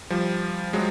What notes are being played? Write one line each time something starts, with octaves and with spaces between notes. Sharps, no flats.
F3 G3
F#3 G#3